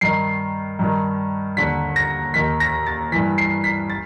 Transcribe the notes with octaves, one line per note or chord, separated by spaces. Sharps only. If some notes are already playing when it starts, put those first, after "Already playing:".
G2 D#3 C7
G2 D#3
D#2 D3 B6
A#6
D#2 D#3 B6
A#6
A6
G2 E3 B6
C7
B6
A6